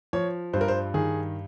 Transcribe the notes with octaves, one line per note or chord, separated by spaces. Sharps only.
F3 C#5
G2 C5
A#4
C5
D#3 G#4